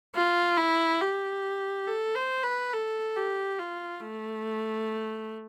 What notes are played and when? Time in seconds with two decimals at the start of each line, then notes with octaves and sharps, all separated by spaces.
0.16 F4
0.58 E4
1.01 G4
1.87 A4
2.16 C5
2.44 B4
2.73 A4
3.16 G4
3.59 F4
4.01 A3